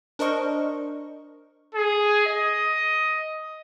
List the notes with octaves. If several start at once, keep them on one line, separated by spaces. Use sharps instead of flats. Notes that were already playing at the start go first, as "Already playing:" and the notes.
D4 A#4 C5 D#5 C#6
G#4
D#5